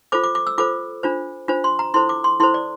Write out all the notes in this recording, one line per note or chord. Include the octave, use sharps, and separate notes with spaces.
F4 A4 C5 D6
D6
D6
E6
F4 A4 C5 D6
D4 F4 C5
D4 F4 C5
C6
A#5
E4 A4 C5 C6
D6
C6
E4 A4 C5 C6
D5